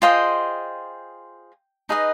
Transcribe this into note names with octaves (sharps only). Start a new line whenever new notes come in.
F4 G#4 C5 D#5 G5
D#4 G#4 B4 D#5